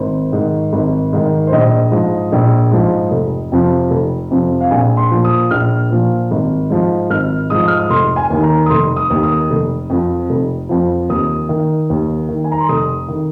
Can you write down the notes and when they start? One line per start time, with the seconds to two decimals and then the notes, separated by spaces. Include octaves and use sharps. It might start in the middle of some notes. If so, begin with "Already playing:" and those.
Already playing: G#1 C5
0.32 G#2 D#3
0.73 G#1
1.13 G#2 D#3
1.47 C5
1.52 A#1 D#5
1.91 G#2 F3
2.32 A#1
2.71 G#2 F3
3.11 F1
3.52 F2 C3 F3
3.91 F1
4.31 F2 C3 F3
4.61 F5
4.71 A#1 G#5
4.97 C6
5.11 A#2 F3
5.25 D#6
5.51 A#1 F6
5.91 A#2 F3
6.31 G#1
6.70 G#2 F3
7.10 G#1 F6
7.50 G#2 F3 D#6
7.68 F6
7.79 D#6
7.90 F1 C6
8.16 G#5
8.30 D#2 D#3
8.43 A#5
8.66 D#6
8.70 F1 C6
8.96 D#6
9.10 D#2 D#3
9.23 D#6
9.50 F1
9.90 F2 F3
10.30 F1
10.69 F2 F3
11.09 D#2 D#6
11.49 D#3
11.90 D#2
12.29 D#3
12.44 G#5
12.52 A#5
12.60 C6
12.69 F1 D#6
13.08 D#3